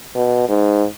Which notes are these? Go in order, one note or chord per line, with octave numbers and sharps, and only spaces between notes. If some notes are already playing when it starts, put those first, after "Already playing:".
B2
G#2